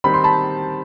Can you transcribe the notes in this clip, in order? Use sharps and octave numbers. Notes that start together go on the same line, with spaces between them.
D#3 G3 C4 D#4 B5
C6
A5 B5